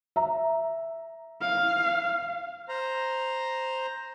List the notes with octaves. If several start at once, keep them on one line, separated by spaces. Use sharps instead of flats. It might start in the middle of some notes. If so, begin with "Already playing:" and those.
E5 A#5
F5
C5 A#5